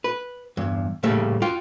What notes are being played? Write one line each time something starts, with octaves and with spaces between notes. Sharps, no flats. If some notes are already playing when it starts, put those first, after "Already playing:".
B4
E2 G2
A2 C#3 G3 A3 A#3
F4 G5